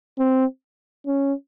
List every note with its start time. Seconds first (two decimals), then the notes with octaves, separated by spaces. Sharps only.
0.19 C4
1.07 C#4